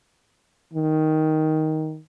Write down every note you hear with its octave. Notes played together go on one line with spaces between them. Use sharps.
D#3